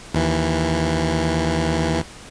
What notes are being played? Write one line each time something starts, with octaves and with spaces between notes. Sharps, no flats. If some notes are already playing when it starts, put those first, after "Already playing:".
D#2 E3